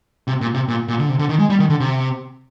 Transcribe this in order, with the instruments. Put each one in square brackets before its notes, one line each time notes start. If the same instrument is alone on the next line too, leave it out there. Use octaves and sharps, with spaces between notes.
[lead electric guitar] C3
A#2
C3
A#2
A#2
D3
C3
D3
D#3
G#3
G3
D#3
D3
C3